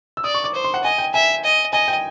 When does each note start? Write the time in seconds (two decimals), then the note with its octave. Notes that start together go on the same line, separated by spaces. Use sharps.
0.17 E6
0.24 D5 D#6
0.35 C#6
0.44 D6
0.54 C5
0.64 C6
0.74 F#5
0.84 D#5 G#5
0.98 G5
1.14 E5 G#5
1.44 D#5
1.73 D#5 G#5
1.88 G5